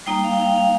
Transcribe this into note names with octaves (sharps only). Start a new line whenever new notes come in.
G3 A#3 D#4 G5
F5
G5
F5
F5